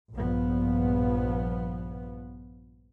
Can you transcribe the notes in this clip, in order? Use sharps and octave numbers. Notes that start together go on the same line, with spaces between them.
A#1 G2 F3 B3